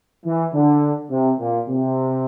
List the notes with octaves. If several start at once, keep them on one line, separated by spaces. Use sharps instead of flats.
E3
D3
C3
A#2
C3